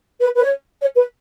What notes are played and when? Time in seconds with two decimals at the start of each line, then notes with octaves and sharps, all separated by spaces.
0.20 B4
0.36 B4
0.43 C#5
0.81 C#5
0.96 B4